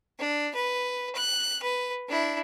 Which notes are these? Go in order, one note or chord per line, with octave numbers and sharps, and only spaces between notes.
D4
B4
F#6
B4
D4 E4